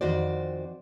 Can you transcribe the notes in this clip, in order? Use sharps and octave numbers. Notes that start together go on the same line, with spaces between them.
F2 D#3 F#4 C5 D5